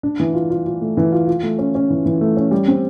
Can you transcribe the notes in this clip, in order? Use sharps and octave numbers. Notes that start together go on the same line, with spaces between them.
D4
E3
F4
F4
F4
A3
E3
F4
F4
A3
C#4
C#4
E3
E3
A3
C#4
G3
C4